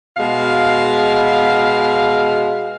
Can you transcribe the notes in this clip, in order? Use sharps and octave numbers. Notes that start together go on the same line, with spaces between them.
B2 G#3 F5